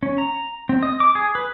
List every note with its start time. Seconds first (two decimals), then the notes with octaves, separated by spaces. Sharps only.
0.03 C#4
0.18 A#5
0.69 C4
0.83 D#5
1.00 D6
1.15 G#4
1.35 B4